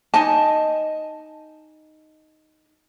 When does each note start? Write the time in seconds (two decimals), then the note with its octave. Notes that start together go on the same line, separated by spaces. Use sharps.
0.14 D#4 D#5 G#5 A5